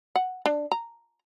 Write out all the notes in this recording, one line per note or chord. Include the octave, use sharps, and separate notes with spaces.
F#5
D4
A#5